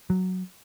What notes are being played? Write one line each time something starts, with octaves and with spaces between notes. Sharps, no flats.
F#3